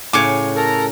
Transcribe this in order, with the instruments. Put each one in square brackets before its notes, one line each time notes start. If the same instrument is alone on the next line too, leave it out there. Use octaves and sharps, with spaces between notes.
[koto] A2 C#3 [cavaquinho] C#5 G#5 D6
[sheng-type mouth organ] A4 A#4 A#5